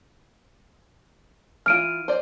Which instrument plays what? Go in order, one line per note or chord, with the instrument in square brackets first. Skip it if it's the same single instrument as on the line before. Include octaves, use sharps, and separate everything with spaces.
[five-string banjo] E3 F4 [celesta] F6 D7 D#7
[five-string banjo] C5 D5